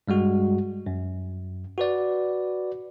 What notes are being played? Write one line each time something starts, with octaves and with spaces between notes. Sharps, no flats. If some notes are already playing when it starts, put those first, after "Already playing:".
G2 G3 G#3 F#4
F#2
F#4 B4 D5